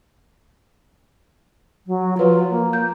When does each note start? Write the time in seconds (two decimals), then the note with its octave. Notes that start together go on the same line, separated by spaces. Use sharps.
1.87 F#3
2.17 F3 F4 B4 C#5
2.50 A#3
2.73 G6